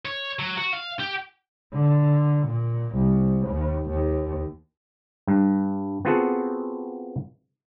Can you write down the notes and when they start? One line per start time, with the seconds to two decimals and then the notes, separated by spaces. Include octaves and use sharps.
0.05 C#5
0.39 F#3
0.57 F#4
0.73 F5
1.00 G4
1.73 D3
2.47 A#2
2.96 C2
3.48 D#2
3.90 D#2
5.27 G2
6.05 B3 C4 F4 F#4 G#4 A4